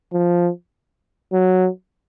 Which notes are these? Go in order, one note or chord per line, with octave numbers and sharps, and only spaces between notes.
F3
F#3